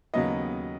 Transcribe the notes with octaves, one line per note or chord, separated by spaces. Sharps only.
D#2 C#3 F#3 B3 D#5